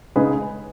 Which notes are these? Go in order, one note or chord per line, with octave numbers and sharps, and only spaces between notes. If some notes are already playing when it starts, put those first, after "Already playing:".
C#3 G#3 D#4 G#4 B4